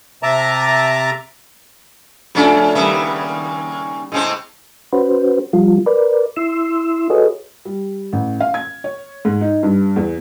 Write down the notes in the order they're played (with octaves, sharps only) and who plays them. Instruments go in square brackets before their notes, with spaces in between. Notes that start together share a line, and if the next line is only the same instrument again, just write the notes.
[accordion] C3 E5 A5 A#5 D6
[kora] C#3 A3 [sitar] F3 C#4 D4
[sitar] D#2 C#3 E5 [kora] G3 A#3 B3
[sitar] A2 C#3 C4 [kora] G#3
[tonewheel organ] C#4 F#4 B4 C5
F3 G3 F4
A#4 B4 D5
E4 C6 E6
F#4 G#4 A4 B4 C#5 D#5
[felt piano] G3
A1
F5
G#6
C#5
G#2
D#4
G2
E2